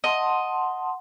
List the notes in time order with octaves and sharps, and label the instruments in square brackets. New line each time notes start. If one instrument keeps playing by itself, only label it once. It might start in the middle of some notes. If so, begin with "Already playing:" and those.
[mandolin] D#5 [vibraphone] F#5 A5 C6